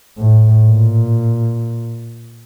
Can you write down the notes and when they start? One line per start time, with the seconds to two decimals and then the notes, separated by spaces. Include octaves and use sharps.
0.18 A2
0.68 A#2